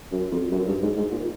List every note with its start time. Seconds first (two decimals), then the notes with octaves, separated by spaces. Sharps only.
0.12 F#2
0.32 F2
0.52 F#2
0.67 G2
0.82 G#2
0.97 G#2
1.12 A#2